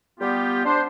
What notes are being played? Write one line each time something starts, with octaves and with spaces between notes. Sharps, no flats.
G3 B3 F4 G4
D4 C5